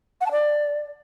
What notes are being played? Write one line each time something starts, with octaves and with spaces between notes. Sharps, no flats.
F#5
A5
D5